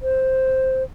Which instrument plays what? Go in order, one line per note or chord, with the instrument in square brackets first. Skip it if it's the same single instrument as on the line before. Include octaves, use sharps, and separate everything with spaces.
[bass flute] C5